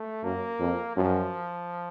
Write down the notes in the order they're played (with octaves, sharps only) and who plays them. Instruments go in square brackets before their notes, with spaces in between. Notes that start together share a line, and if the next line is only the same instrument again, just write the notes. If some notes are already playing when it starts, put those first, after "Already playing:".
Already playing: [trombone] A3
[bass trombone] F#2 [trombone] A#3
[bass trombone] F2
[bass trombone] F#2 [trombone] F3